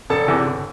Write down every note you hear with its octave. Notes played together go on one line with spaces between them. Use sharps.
E1 A4 A5
E2 C3 E3
G1